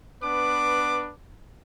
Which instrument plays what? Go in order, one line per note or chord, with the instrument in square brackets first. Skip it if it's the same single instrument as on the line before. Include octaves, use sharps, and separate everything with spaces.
[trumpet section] B3 D4 B4 D6